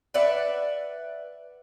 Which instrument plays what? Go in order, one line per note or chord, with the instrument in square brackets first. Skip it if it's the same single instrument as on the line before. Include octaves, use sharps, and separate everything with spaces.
[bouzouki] B4 D5 E5 F#5